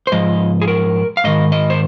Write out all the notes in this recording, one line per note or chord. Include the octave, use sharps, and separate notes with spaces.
C5
G#2 F3 D#5
G#4
A#4
F5
G#2 D#3 D#5
D#5
C5